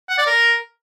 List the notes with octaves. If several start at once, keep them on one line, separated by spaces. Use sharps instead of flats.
F#5
D5
A#4